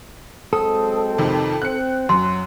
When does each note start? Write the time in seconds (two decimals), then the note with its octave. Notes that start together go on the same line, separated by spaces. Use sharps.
0.53 F#3 G#3 C4 A4 D#6
1.18 F2 C3 D#3
1.62 C4 F#6 C#7
2.09 F#2 F#3 C6